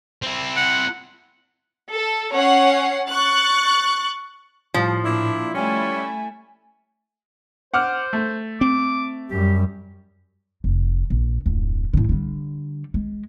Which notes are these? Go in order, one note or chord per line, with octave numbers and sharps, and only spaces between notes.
C4 E4
F#5
A4
C#4 C#5 F#5 C7
C#6 F#6 A6
A2 F3 G3
A#2 D4 E4
G3 A3 C#4 E4 G#5
C5 F#5 D6 F6
A3
C4 D6
F#2 G3 G4
F1
A#1
D1 F2
A2 D3
D3 G3
G#3